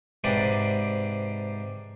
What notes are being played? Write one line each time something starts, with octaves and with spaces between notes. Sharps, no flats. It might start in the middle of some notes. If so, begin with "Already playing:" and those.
G#2 C3 C4 D4 B4 D#6